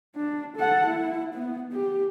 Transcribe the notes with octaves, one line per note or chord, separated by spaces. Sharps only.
D4
A4 F#5
E4
B3
G4